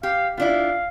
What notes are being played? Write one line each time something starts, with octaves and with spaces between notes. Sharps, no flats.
G4 F5
B3 D4 E4 F4 D5 F5